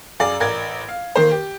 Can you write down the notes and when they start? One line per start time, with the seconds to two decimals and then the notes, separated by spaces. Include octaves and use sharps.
0.20 F#2 G#4 D5 F5
0.40 A1 A#4 D5 G#6
0.89 F5
1.16 D#3 A#3 C5
1.31 G4